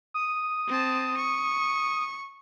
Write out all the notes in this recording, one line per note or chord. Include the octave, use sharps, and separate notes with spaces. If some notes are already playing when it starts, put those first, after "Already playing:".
D#6
C4 A5
C#6